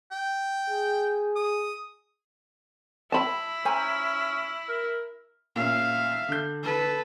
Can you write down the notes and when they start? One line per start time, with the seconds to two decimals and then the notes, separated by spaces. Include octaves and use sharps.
0.11 G5
0.70 G#4
1.36 D#6
3.12 E4 A5 B5
3.65 C#4 C5 G#5 A#5
4.69 A#4
5.56 A#2 C#4 E5 F5
6.29 D3 G6
6.63 A4 B4